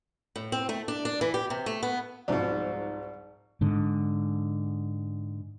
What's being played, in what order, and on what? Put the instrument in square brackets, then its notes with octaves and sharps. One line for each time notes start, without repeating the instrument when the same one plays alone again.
[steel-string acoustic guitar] A2
C4
A3
D4
D4
E3
G4
C3
A3
B3
[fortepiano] C2 B2 [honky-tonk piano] G#2 F3 [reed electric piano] D5
[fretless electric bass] G#2 D3